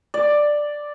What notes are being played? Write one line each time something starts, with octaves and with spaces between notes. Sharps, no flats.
D5